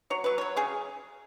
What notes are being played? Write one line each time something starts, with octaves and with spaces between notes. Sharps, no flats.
F#3 C#5
F#3 B4
F#3 C#5
C#3 G#4